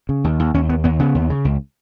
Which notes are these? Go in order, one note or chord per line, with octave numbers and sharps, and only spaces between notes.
C#3
D#2
D#2
D#2 C#4
D#2 B3
D#2 B3
C#3 B3
D#2
C#3
C#2